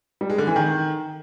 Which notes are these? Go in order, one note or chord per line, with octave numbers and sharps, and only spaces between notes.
G3
G#3
D3
E3
D#3